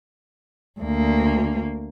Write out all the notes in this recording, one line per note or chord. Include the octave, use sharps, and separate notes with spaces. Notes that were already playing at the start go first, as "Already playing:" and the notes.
D2 A#3